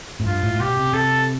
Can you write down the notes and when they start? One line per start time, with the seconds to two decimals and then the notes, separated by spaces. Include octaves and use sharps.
0.20 A2
0.26 G2 F4
0.43 A2
0.53 A2
0.60 B2 G4
0.77 C3
0.93 C3 A4